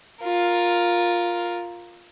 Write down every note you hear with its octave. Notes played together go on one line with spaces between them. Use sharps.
F4 A#4